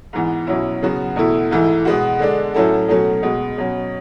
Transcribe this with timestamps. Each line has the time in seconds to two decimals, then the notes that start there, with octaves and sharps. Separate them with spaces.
0.13 G#2 E3 B3
0.47 B2 F#3 C#4 E4
0.82 C#3 F#3 B3 F#4
1.16 E2 B2 A3 E4
1.51 G#2 E3 A3 E4
1.85 B2 G#3 B3 F#4
2.19 D3 G#3 D4
2.54 A2 F#3 C#4 E4 A4
2.88 B2 F#3 A3 C#4
3.23 B2 G#3 B3
3.58 B2 F#3 C#4